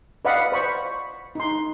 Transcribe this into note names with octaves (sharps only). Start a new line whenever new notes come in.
B4 D5 D#5 F5 F#5 B5
C5 B5 C#6
D#4 C6